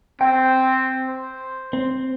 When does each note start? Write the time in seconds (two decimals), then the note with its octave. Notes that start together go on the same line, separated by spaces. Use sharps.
0.21 C4 G5
1.09 C5
1.73 C4